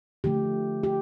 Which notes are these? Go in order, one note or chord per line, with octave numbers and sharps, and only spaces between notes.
D3 F3 A3 G4
G4